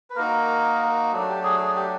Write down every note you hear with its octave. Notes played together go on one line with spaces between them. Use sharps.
B4
A#3 D#4 F#4 A#4
F#3 A3 D4
G4
G#4
G#4
G4